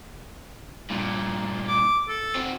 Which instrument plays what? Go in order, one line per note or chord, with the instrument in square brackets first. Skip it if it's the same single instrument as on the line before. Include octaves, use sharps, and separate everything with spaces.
[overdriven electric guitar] G2 A#2
[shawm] D6
A4
[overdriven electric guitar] C4 F#4